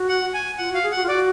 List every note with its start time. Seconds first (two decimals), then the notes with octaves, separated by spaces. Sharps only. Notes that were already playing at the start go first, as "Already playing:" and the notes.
Already playing: F#4
0.09 F#5
0.34 G#5
0.58 F4 F#5
0.70 F#4
0.74 F5
0.83 G#4
0.91 F#4 F#5
1.03 F4
1.08 F#4 D5